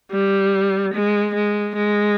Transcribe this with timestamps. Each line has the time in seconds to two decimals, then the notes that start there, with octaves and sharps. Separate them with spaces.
0.11 G3
0.94 G#3
1.35 G#3
1.75 G#3